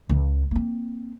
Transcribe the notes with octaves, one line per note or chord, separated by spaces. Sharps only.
C#2 C#3
A#3 C4